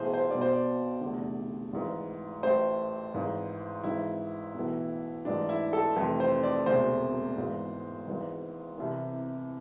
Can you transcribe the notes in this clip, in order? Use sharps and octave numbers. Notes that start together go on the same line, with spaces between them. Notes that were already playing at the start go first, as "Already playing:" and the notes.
Already playing: B1 A2 E3 G#4 C5
C5
B1 B2 D5
C5
D5
F1 E2 D3
G#1 G#2 E3
A1 A2 E3 C5
G#1 G#2 E3
G#1 G#2 E3 E4
B1 A2 E3
A1 G#2 E3 D4
E4
A4
F1 F2 E3
C5
D5
E1 D2 C3 C5
G#1 G#2 E3
G#1 G#2 E3
C2 C3 E3